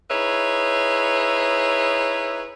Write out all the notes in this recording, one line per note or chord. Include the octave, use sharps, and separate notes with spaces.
D#4 E4 G#4 B4 C#5 E5